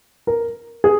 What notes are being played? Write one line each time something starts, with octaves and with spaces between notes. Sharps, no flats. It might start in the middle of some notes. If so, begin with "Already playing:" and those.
A#4
G#4